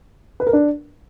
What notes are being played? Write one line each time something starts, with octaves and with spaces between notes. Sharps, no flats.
B4
A#4
D4